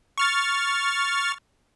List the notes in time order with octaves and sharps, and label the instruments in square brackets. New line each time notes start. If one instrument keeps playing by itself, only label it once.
[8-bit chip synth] C#6 F6 A6